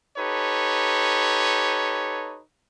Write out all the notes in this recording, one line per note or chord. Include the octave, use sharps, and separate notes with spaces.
D#4 G4 A4 B4 C#5